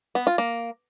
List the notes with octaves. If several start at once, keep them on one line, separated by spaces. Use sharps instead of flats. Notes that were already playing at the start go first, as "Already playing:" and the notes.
B3
F4
A#3